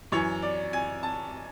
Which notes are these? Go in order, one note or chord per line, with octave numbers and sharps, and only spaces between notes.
F#2 E3 C#5
D5
G#5
A5